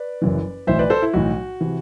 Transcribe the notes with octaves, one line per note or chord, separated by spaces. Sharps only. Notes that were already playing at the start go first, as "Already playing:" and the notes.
Already playing: B4 D5
F#1 F#2 E3
B1 A2 E3 C5 E5
B4 D5
A4 C5
E4
B1 A2 E3 F#4
C3 E3